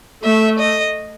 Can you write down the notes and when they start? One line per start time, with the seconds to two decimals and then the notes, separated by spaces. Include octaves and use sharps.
0.24 A3 E5
0.59 D#5